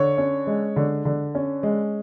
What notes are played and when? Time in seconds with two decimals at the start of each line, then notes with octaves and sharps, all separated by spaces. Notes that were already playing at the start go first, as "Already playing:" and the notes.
Already playing: D3 C#5
0.18 C#4
0.47 G#3
0.76 D3
1.05 D3
1.35 C#4
1.63 G#3